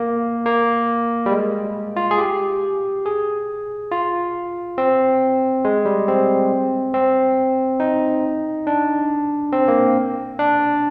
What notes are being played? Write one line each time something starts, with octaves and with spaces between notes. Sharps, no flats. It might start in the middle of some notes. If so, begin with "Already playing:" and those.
Already playing: A#3
A#3
G3
G#3
F4
G#4
G4
G#4
F4
C4
G#3
G3
C4
C4
D#4
D4
C4
A#3
D4